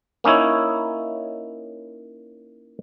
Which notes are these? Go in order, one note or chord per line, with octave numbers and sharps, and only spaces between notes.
A#3 C#4 D#4 E4 C#5